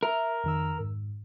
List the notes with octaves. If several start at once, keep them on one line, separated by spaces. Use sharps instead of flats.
A#4 E5
F2 D#3 E6
G#2